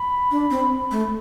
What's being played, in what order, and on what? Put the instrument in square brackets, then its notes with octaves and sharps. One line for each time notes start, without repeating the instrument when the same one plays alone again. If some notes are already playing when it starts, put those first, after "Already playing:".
Already playing: [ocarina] B5
[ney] D4
C4
A3